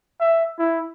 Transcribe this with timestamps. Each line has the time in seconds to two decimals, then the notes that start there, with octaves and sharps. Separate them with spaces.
0.21 E5
0.59 E4